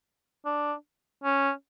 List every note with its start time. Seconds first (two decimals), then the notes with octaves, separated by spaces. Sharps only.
0.45 D4
1.24 C#4